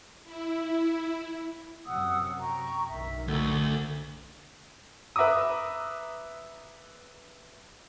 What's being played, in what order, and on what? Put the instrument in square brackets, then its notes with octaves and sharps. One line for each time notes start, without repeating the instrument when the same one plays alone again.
[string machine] E4
[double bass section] F#2 C3 [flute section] F#5 D#6 E6
[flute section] G5 A#5 C#6
[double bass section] F#1 B1 D#3 [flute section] E5
[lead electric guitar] D2 [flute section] A4 F#5
[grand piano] B4 E5 A#5 D6 D#6